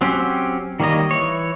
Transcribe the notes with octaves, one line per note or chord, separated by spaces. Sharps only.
F#3 C4 C#4 G4
D#3 G3 A#3 C#5 D#5
E3 C#5